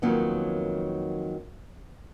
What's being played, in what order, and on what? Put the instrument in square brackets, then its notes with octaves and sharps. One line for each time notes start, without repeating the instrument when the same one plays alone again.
[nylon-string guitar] F2 D#3 F#3 A#3 B3